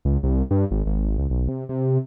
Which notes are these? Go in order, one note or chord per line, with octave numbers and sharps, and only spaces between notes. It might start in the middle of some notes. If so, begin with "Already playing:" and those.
C#2
C2
G2
G#1
G#1
C#2
B1
C3
C3